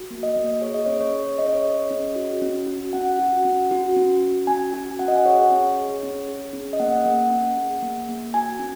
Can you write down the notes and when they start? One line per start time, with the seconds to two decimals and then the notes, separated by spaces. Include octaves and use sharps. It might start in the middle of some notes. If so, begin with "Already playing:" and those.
Already playing: F#4
0.10 A#3
0.23 D#5
0.36 A#3
0.61 G#4 C#5
0.74 D#5
0.86 C#4 C#5
1.01 C#5
1.13 G#4
1.38 C#4 D#5
1.46 C#5
1.53 D#5
1.65 G#4
1.91 C#4
2.16 F#4
2.42 C#4
2.67 F#4
2.93 C#4 F#5
3.19 F#4
3.45 C#4
3.71 F#4
3.96 C#4
4.22 F#4
4.47 C#4 G#5
4.73 F#4 G#5
4.99 C#4 F#5
5.08 D#5
5.16 F#5
5.25 G#4 C#5
5.51 C#4
5.77 G#4
6.03 C#4
6.28 G#4
6.53 C#4
6.73 D#5
6.80 A#3 F#5
7.05 A#3
7.31 C#4
7.57 G#4
7.83 A#3
8.09 A#3
8.34 F#4 G#5
8.59 C#4